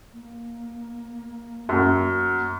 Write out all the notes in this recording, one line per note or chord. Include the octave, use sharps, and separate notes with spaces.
A#3
F#2